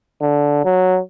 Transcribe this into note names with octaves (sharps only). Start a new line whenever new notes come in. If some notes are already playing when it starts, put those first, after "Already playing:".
D3
F#3